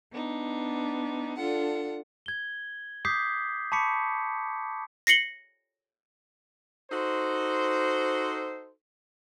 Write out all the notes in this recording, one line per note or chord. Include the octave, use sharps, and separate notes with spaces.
B3 D4 D#4
D4 F4 A4 F#5
G#6 G7
D6 D#6 G6 B6 C7
A5 B5 C#6 D6 B6 C#7
A#6 C7 C#7 F#7 G7
D#4 F#4 A4 C5